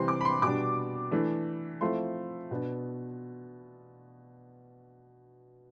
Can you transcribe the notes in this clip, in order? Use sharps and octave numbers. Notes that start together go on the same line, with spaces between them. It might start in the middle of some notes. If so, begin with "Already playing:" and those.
Already playing: C3 E3 G3 C4 C6
D6
B5
C6
B2 G3 D4 D6
E3 A3 D4
F3 A3 C4 E4 C6
B2 B3 D4